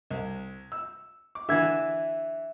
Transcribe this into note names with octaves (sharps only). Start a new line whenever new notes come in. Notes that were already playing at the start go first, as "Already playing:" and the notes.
C2
E6
D6
D3 E3 E5 G#6